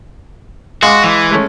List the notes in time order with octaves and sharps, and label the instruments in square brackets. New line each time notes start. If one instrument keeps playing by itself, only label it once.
[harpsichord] G#3 [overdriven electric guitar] F#4 [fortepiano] F5 C6 D6
[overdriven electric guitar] E3
[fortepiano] G#3 A3 C#4